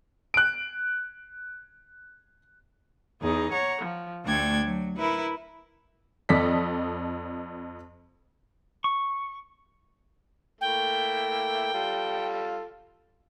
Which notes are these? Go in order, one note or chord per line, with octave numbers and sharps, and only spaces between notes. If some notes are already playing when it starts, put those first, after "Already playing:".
F#6 D7
E2 D#4 G#4
C#5 F#5 A#5
F3
D2 A3 D4 G5 G#6
F#3
E4 A#4 B4
F2 A4 D5 D#5 B6
C#6
A3 A#3 E4 G5
G3 F4 A4